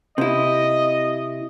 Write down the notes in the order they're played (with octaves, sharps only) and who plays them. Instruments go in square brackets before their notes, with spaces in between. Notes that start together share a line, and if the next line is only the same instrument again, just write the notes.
[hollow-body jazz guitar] C3 E4 [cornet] D#5